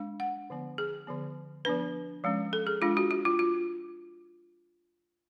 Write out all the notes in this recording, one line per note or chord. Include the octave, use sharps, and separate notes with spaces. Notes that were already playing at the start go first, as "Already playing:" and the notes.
Already playing: G#3 D4
F#5
D3 F3 B3
G#4
D3 F3 B3
F3 B3 D4 B4
F3 G#3 C#4
A4
G#4
G#3 D4 F4
F#4
F#4
F4
F4